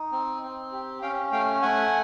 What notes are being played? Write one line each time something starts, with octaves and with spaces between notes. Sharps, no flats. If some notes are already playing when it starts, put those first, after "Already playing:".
Already playing: D#4
C4
C4
G4
C#4 F5 G5
A3 F5 G5
A3 F#5 G#5